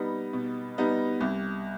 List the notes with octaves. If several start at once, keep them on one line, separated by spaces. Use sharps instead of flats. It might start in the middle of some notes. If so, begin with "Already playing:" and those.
Already playing: G3 B3 D#4
B2
G3 B3 D#4
C2